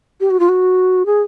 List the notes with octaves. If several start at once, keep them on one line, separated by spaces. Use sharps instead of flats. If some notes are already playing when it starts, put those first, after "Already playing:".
G4
F#4
F4
F#4
G#4